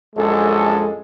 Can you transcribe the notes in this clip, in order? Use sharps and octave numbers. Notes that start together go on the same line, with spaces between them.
A#1 F#2 G#3 A4